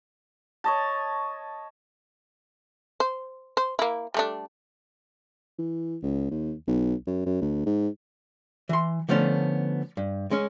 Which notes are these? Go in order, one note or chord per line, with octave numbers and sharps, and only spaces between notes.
C#5 D#5 A5
C5
C5
A#3 E4
G3 A3 D4
E3
C#2
D#2
B1
F#2
F#2
D2
G#2
E3 C6
D3 F3 A3 B3 C#4
G2
G#3 C#4